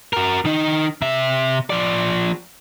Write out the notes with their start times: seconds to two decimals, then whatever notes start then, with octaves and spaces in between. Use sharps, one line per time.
0.13 F#4 A#4
0.45 D#3 D#4
1.02 C3 E5
1.70 F3 D5